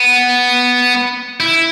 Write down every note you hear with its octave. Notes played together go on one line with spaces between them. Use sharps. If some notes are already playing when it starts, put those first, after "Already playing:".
Already playing: B3
E4